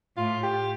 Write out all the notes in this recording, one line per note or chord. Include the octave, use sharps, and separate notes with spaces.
A2 F4
G4